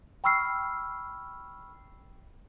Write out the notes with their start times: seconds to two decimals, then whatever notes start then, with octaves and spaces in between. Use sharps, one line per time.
0.24 G5 B5 C#6 E6 F6 C7